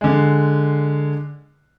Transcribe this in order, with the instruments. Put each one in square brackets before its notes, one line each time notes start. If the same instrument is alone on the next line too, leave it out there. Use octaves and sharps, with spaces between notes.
[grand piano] D3 G#3